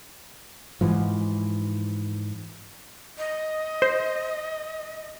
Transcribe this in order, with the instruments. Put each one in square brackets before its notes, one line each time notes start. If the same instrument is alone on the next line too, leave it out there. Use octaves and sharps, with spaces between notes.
[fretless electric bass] G#2 E3 F3
[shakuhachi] D#5
[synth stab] C5